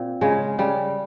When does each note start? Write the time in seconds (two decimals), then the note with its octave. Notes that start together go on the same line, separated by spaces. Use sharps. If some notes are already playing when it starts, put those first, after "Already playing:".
Already playing: A#2 C4
0.21 C#3 G#3
0.58 C#3 G3